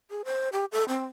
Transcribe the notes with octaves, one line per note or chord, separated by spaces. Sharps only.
G#4
C5
G4
A4
C4